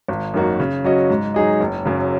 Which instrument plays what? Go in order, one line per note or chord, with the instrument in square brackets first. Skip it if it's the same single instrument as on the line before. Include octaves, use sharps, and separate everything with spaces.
[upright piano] G#1
F#2 D#3 A#3 F#4
C#3
F#3 C#4 F#4 D#5
G#2
F#3 D#4 G#4 D#5
F#1
F#2 C#3 F#3